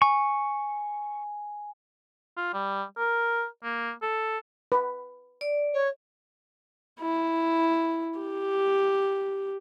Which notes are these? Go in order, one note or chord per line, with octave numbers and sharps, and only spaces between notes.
G#5 C#6
F4
G3
A#4
A#3
A4
B4
D5
C#5
E4
G4